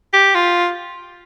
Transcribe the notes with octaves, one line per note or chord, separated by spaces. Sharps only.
G4
F4